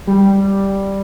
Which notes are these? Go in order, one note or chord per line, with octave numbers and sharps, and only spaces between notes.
G3